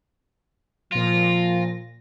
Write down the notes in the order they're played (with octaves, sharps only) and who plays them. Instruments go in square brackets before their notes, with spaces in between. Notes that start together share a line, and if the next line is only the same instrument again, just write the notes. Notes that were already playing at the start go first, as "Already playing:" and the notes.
[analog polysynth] A#2 A#6 [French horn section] F3 [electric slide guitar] F4